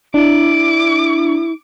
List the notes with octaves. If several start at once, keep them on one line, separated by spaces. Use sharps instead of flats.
D4 E4 D6